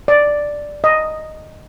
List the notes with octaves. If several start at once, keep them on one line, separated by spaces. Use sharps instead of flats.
D5
D#5